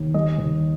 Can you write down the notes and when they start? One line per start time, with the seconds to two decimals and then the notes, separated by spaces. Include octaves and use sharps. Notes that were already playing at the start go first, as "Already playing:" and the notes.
Already playing: D#2
0.14 G3 D#5
0.38 D#2